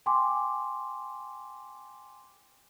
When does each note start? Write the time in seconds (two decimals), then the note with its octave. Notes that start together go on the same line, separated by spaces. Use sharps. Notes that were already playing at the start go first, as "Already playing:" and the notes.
0.06 G5 G#5 C6 D6